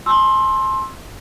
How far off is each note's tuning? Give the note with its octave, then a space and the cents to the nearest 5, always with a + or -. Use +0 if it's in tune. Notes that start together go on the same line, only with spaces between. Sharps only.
A5 -40 C6 +20 E6 +0